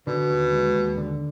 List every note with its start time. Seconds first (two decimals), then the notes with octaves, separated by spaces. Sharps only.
0.07 B2 D3
0.30 D#2
0.52 G#3
0.75 D#2
0.97 D3